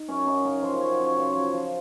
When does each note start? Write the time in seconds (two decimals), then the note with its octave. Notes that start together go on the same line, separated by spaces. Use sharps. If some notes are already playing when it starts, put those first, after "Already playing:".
Already playing: D#4
0.08 F#2 C#4
0.27 F#2 D#4
0.45 C#3 A#4
0.62 F3 C5
0.81 F#2 C#5
1.00 F#2
1.05 C#5
1.17 C#3 C5
1.29 C#5
1.35 F3
1.53 F3 C5